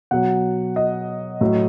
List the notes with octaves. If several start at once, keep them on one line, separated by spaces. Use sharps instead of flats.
B2 F#3 F#5
D#5
A2 F#3